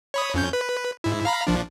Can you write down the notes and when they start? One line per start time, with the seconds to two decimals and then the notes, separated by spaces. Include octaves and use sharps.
0.14 C#5 B5 D#6
0.34 F2 C#4 G6
0.53 B4
1.04 G#2 E4
1.25 F5 A#5 B5
1.47 A#1 F3 D4